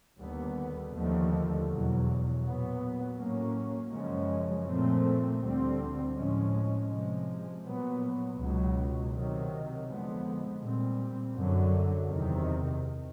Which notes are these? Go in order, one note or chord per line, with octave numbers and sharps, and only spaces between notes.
D#2 D3 G3 B3
D#2 D3 F3 A3
E2 B2 F#3
A#2 F#3 B3
A2 F#3 A#3 C#4
F#2 C#3 F3 G#3 C#4
A#2 F3 A3 C4
D2 D3 G3 C4
A2 F3 G#3 C#4
C3 F3 G#3
A#2 F#3 B3
C#2 B2 F#3
C3 D#3 F#3
F2 D3 F3 G#3 B3
A#2 G3 C4
F#2 D3 F#3
E2 C3 D#3